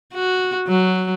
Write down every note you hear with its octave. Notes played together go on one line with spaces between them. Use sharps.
F#4
F#3